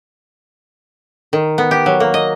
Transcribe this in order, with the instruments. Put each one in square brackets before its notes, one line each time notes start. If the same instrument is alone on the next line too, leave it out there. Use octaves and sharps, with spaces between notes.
[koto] D#3
B3
G4
F#3
A#3
D#5